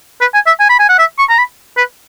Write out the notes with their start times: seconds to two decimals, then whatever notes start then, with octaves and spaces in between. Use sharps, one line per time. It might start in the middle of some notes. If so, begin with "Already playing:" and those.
0.21 B4
0.34 G#5
0.47 E5
0.60 G#5
0.70 B5
0.79 G#5
0.89 F#5
0.99 E5
1.18 C#6
1.29 A#5
1.38 B5
1.77 B4